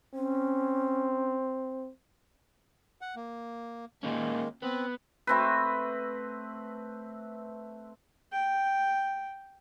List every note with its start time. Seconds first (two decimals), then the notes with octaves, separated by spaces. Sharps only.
0.14 C4 C#4
3.01 F#5
3.16 A#3
4.03 A#2 D#3 G#3 A#3 C#4
4.62 B3 C4
5.27 A3 C4 B4
8.32 G5